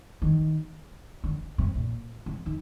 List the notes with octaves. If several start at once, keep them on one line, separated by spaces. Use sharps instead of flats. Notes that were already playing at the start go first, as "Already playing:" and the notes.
D#3
D3
C3
A#2
C3
D#3